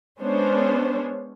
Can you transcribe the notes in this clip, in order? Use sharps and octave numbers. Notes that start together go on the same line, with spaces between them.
G#3 B3 C#4 D4 C5 C#5